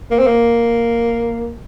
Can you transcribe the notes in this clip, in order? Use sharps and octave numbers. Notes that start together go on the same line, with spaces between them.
A#3
C4
A#3